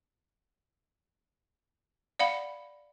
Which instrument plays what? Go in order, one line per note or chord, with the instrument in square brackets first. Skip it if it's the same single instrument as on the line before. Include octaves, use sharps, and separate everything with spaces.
[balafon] D5 F5 F#5 B5